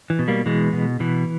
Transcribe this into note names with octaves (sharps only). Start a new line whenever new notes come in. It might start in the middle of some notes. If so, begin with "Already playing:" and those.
E3
B2
G3 A#3
B2 E3 G#3
B2
B2 E3